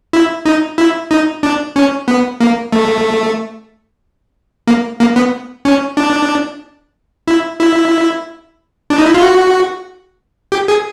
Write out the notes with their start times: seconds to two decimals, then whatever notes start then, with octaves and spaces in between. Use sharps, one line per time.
0.13 E4
0.45 D#4
0.78 E4
1.11 D#4
1.43 D4
1.76 C#4
2.08 B3
2.40 A#3
2.72 A3
4.67 A#3
5.00 A#3
5.16 B3
5.65 C#4
5.97 D4
7.28 E4
7.60 E4
8.90 D4
8.98 D#4
9.06 E4
9.14 F4
9.22 F#4
10.52 G4
10.68 G#4